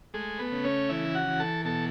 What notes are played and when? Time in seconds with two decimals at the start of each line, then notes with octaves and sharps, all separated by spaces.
0.14 G#3 A3 G#4
0.39 B3 B4
0.52 C#3
0.64 C#4 C#5
0.89 E3 E4 E5
1.15 F#4 F#5
1.27 E3
1.39 A4 A5
1.65 B2 A4 A5